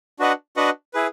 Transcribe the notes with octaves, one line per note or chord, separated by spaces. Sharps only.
D4 F#4 B4 D#5 F#5
D4 F#4 B4 D#5 F#5
E4 G#4 B4